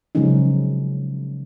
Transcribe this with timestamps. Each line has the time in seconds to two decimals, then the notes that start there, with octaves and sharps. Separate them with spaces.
0.15 C#3 F3 F#3 G#3 C#4 D#4